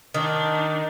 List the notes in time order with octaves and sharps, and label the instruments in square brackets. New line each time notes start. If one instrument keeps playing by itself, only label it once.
[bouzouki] D#3 [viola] D4 D#4